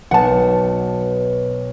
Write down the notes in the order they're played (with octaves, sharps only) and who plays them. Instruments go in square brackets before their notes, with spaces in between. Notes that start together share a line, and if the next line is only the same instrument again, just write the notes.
[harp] B1 [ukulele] F#5 A5